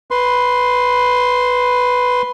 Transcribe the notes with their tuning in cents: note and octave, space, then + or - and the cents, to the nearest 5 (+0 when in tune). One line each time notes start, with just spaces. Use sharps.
B4 +0 C6 +0